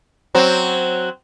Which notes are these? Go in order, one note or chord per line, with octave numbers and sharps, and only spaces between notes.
F#3 C4